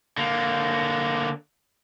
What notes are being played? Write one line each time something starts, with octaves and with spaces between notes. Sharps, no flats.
D3 A#3